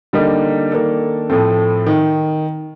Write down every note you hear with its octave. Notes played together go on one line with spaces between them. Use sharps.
D3 G3 A#3 D#4
D#3 A#3 D4 A4
A2 F3 A3 C4
D#3